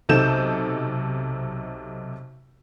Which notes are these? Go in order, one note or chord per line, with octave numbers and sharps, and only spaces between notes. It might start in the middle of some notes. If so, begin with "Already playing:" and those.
B1 C3 D#4 A4 G6 E7